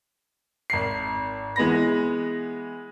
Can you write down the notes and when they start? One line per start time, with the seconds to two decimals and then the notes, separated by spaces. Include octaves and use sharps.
0.70 G#1 C7
1.56 E3 G#3 B3 B5 A#6